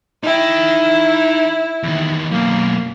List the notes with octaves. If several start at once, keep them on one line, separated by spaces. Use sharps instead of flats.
D#4 E4 G5
E2 D#3
F#2 B2 A#3